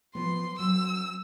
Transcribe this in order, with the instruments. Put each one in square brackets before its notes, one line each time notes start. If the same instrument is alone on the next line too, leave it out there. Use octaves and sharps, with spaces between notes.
[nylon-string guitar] F3 B3 [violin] C6
[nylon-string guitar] F#3 [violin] E6